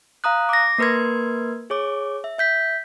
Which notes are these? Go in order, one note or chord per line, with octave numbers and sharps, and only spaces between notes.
F5 A#5 D#6 F#6
D6 A#6
A#3 A#4 B4 C6 G#6
G#4 C#5 D6
E5
E5 G6 B6